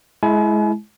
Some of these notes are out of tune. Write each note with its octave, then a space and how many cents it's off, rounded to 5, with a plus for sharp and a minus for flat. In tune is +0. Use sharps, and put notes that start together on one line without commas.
G#3 +25 E4 +0 G#5 +40